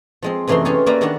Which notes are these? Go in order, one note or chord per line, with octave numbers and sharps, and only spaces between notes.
F3 G#3 C4
F#2 C3 E3 A3 D#4 C6
C#4 F4 G4 G#4
A#3 C#4 B4 D5 E5 A#5
D#3 D4 A4 F#5 A5